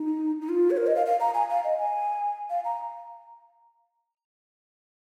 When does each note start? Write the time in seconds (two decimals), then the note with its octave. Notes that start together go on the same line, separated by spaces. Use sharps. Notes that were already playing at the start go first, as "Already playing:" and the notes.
Already playing: D#4
0.41 D#4
0.49 F4
0.71 C#5
0.77 A#4
0.87 D#5
0.96 F5
1.06 F5
1.20 A#5
1.34 G#5
1.50 F5
1.64 D#5
1.78 G#5
2.50 F5
2.65 A#5